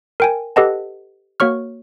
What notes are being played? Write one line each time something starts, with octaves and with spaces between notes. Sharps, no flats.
A#4 G5 G#5
G4 A4 B4 D#5 F#5 A5
A#3 F#4 C#5 C#6 F6